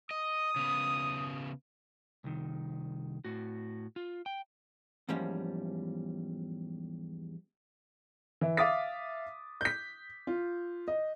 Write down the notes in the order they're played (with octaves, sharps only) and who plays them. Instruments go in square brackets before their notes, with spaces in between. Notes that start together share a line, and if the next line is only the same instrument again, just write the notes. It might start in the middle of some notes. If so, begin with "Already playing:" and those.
[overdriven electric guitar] D#5 [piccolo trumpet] D#6
[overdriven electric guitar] C#3 B3
[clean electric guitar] C2 D#3
A2 F#4
F4
G5
[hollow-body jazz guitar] E2 G#2 F3 G3 A#3 C#4
[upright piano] E3 E5
E5 F5 D6 D#6 A6 B6
G6 B6
F4
D#5